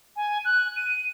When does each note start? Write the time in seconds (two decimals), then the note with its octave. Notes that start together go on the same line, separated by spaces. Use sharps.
0.16 G#5
0.45 F#6
0.76 D#7